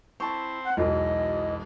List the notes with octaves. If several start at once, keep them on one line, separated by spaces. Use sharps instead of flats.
C4 E4 A5 C#6
F#5
E1 B1 E2 D#5